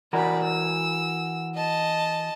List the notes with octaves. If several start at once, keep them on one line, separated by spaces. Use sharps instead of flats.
E3 F#4 A#4 D5 B5
E6
D#5 A5